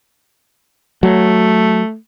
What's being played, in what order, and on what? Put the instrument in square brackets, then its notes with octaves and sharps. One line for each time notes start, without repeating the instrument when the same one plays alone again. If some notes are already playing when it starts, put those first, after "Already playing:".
[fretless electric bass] F#3 [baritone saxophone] A3